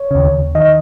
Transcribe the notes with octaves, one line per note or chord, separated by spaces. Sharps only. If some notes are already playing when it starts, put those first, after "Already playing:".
Already playing: C#5
D#2 C#3
D#3 D#5